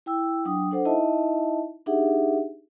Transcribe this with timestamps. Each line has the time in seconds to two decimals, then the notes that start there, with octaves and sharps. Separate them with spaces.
0.06 E4 G5 E6
0.45 F#3 D4 G5 D#6
0.71 D4 A4 C5 F#5
0.85 D#4 E4 D#5 E5 A5
1.86 D4 D#4 G4 G#4 E5 F#5